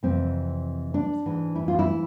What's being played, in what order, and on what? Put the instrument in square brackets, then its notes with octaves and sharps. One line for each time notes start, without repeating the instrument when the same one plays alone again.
[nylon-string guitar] F2 C3 E3 C4
D4
G#2 E3
E4
F4
E4